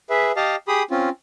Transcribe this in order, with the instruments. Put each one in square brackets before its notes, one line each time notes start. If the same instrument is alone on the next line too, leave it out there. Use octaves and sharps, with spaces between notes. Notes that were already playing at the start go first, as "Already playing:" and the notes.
[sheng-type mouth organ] G#4 B4 E5
G4 D#5 F5 A5
G4 G#4 B5 D#6
C4 C#4 F4